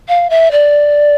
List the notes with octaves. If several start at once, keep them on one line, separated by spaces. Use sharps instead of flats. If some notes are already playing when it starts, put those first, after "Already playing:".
F5
E5
D5